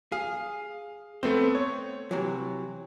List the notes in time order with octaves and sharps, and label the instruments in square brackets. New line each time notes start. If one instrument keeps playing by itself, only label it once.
[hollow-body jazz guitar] G#4 [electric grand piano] F5
[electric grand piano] A3 B3 C4 [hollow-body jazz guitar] C5
[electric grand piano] C#5
[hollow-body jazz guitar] C3 E3 F#3